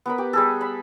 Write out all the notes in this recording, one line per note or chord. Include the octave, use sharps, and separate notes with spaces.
B3 A#4 B5
G4
G3 G#4 A4
B5